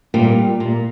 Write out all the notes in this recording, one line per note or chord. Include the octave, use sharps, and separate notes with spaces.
A#2 G3
A#2